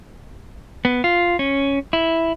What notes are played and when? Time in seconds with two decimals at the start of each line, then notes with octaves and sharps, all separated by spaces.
0.85 B3
1.04 F4
1.39 C#4
1.93 E4